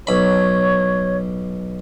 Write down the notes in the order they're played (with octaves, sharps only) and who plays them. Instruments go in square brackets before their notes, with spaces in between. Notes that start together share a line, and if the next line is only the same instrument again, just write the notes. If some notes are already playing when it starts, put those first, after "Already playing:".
[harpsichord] B1 B5 [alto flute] C#5